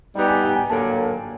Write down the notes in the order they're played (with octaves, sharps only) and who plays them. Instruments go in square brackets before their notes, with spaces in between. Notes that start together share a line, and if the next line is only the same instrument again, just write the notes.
[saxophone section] G3 B3 D#4 G4 [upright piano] D5
[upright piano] G#5
G5
G#5
[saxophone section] D3 F#3 A#3 [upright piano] A5